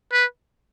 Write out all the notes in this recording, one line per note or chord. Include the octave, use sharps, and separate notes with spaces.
B4